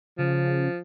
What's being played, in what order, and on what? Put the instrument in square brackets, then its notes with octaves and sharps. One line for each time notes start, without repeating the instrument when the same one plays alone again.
[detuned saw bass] C#3 [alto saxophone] F3